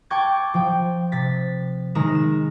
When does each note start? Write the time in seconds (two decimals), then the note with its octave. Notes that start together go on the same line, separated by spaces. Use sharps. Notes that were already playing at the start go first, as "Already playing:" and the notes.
0.10 G5 A5 C#6 D6 G#6 A6
0.54 F3 G5
1.12 C3 A6 B6
1.95 D#3 G#3 A#5 E7
2.15 E7